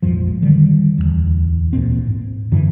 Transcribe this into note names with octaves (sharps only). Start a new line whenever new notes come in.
A#1 F2 G#2 F3
D3 D#3 G3
D1 G#1 E2
A1 D2 A#2 C4
G#2
F#2 D3 E3 F#3